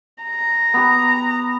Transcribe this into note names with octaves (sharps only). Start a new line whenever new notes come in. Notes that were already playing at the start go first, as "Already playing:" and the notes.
A#5
B3 G4